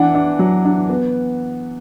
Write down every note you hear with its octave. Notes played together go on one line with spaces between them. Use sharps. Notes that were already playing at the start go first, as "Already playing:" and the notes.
Already playing: E3 D4 F#5
D4
F#3
D4
B3